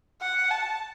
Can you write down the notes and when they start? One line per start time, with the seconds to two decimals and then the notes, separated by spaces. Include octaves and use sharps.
0.21 F#5
0.50 A5